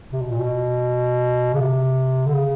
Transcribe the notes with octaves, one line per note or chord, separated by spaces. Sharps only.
C3
B2
A#2
B2
C#3
C3
D3
C#3